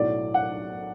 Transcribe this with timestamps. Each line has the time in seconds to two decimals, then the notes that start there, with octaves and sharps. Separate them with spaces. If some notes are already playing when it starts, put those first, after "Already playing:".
Already playing: B1 A2 F#3 D5
0.34 F#5